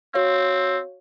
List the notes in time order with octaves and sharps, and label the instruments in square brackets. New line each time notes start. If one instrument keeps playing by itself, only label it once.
[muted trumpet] C4 [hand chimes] F#4 C#5 F5